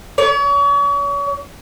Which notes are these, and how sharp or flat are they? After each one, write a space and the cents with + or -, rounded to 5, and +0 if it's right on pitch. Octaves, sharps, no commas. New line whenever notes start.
C#5 +40